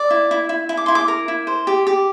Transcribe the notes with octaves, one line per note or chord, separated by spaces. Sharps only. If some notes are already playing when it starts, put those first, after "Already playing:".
Already playing: D5
E4
E4
E4
E4
D6
E4 C6
D6
A#4
E4
C5
G4
G4